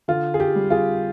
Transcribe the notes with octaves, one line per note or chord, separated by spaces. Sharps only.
D3 F4
G#4
G4
G3
F4 G#4